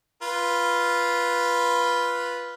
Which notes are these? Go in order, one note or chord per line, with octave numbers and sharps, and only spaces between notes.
F4 B4